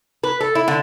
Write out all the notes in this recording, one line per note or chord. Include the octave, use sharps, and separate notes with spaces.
B4
A4
E4
D3